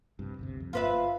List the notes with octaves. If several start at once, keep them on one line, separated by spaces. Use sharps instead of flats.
A#1 G2 C3
G1 D2 C3
F2
G1 G2 A#3 F4 B4 E5